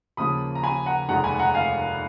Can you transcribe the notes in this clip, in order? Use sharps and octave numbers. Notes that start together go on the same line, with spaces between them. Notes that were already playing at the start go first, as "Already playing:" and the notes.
D#2 C#3 F3 A#3 B5 D#6
A#5
G#5 B5
F#5 A#5
F1 D#2 D#3 G#3 F#5 A#5
G#5 B5
F#5 A#5
F5 G#5